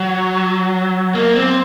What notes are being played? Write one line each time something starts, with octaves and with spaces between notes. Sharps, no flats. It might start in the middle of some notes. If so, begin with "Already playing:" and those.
Already playing: F#3
A#3
C4